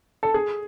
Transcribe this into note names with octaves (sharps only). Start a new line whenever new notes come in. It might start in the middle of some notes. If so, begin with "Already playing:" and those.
A4
G#4